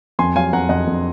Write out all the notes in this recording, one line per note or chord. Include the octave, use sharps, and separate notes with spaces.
F2 G#5 C6
F#3 F5 G#5
F2 F#5 A#5
F2 D#5 F#5
F2